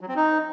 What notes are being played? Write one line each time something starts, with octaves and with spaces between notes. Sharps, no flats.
F#3
C4
D#4